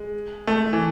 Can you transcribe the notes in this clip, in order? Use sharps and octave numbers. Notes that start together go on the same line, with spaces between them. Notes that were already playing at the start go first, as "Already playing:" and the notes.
Already playing: G#3
A3
E3